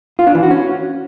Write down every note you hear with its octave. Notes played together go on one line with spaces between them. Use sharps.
F4
D4
E3
F#4
C#4